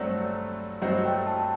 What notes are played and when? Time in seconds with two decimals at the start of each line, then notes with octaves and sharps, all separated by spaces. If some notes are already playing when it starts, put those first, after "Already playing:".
Already playing: G2 F#3 A3 C4 F#4 D5
0.82 G2 F#3 A3 C4 F#4 D#5
1.05 G5
1.27 A5